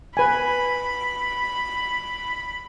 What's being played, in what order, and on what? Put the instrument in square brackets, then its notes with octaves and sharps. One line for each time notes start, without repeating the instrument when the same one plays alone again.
[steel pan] B4 G#5 [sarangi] B5